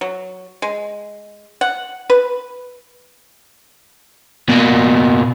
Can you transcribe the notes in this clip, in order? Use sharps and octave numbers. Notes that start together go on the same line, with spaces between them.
F#3
G#3
F#5
B4
B2 A#3